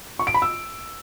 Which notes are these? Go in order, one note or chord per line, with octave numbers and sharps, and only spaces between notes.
C#6
D7
B5
E6